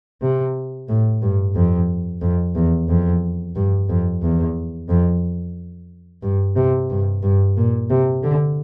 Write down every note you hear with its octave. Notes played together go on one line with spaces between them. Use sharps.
C3
A2
G2
F2
F2
E2
F2
G2
F2
E2
F2
G2
C3
G2
G2
A#2
C3
D3